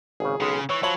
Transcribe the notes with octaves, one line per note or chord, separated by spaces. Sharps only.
G#1 C#3 G#4
B1 C#3 G#3
E3 C#5 E6
F3 F#3 C#5 B5 F#7